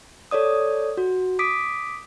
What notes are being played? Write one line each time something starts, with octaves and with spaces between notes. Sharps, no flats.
A4 C#5 D5 D#6
F#4
D6 D#6 B6 D7